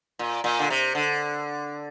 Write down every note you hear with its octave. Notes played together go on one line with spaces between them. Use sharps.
A#2
A#2
D3
C3
D3